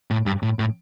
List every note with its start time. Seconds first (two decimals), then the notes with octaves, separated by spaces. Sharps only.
0.11 A2
0.26 G2
0.43 A2
0.59 A2